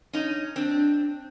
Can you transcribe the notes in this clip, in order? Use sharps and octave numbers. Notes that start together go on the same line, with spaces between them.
C#4 D#4
C4 D4